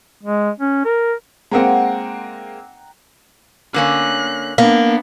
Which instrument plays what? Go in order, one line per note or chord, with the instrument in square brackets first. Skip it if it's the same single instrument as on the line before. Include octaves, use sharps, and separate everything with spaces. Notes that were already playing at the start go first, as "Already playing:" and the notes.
[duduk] G#3
C#4
A#4
[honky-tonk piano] G#3 A#3 C4 [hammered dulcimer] F#5 G5 A#5
[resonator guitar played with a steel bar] D3 A#3 C#4 [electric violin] F#6
[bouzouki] A#3 [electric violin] B3 D4